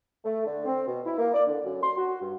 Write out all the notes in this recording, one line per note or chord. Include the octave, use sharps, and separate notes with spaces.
A3
D3
C4
B2
E4
A#3
D5
D3
F#2
C6
F#4
G2